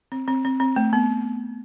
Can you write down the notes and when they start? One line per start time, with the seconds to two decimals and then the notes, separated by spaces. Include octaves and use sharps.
0.12 C4
0.28 C4
0.45 C4
0.60 C4
0.76 A3
0.93 B3